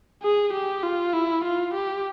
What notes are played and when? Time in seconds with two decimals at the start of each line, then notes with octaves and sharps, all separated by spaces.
0.23 G#4
0.53 G4
0.83 F4
1.13 E4
1.44 F4
1.74 G4